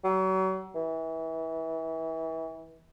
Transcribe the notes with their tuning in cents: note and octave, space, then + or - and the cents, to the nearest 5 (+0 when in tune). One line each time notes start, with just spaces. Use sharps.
F#3 +35
E3 -30